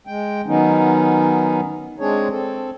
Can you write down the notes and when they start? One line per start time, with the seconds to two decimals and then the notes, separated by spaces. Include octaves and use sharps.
0.07 G#3 G5
0.47 D#3 F#3 B3 C#4 D#4
2.00 G#3 C4 D4 G#4 C#5
2.31 C4 A4